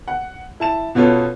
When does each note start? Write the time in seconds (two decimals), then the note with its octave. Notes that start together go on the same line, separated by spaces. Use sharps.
0.08 F#5
0.60 E4 A5 E7
0.95 B2 B3 C#4 F4 A4